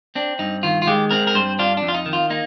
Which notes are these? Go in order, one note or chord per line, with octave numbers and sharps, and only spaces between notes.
C4 D4
G2 D#4
D#3 F4
F4
G#3 G4
C4 A#4
A#4
G2 C5
D4 F4
D4
F2
F4
D#4
D#3
F4
A#3 D#4